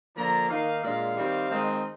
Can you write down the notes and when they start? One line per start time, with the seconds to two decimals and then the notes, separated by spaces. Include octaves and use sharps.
0.15 D3 F3 A#3 D4 A#5
0.49 D#3 A#3 D#4 F5
0.81 A#2 G#3 D4 F5
1.15 D#3 G3 C4 D#4
1.49 D#3 G#3 C4 D#4